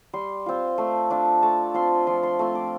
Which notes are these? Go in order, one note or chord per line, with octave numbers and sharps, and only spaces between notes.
G3 C6
C4 F4
A3 C6
D4 F4
A3 A5
C4 F4 C6
F3 C6
C6
A3 C4 F4
D6